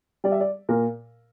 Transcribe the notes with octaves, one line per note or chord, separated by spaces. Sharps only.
G3 D5
E5
D5
A#2 A#4